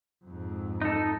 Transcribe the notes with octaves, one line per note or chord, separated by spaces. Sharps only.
F2 G#2
D#4 A4